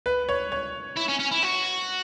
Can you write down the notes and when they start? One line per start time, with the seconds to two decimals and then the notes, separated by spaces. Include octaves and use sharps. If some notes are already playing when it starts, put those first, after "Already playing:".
0.06 B4
0.29 C#5
0.52 C#5
0.97 E4
1.09 C#4
1.20 C#4
1.32 E4
1.43 F#4